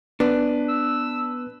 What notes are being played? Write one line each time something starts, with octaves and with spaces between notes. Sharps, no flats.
B3 D4 B4
E6